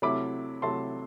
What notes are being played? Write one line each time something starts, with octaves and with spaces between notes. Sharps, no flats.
C3 F#3 A3 E4 B5 D6
C3 F#3 A3 E4 A5 C6